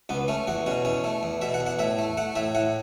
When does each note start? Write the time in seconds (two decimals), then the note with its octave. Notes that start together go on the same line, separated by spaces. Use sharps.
0.09 C#2 B3
0.28 A3 C#4
0.47 E2 F#4
0.66 B2 C#4
0.85 E2 C#4
1.04 A3
1.23 E2
1.41 B2 E5
1.54 F#5
1.60 E2
1.66 F#5
1.79 A2 E5
1.98 A3
2.17 A3 F#5
2.35 A2 E5
2.55 A2 F#5